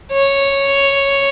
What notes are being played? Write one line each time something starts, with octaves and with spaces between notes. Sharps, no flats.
C#5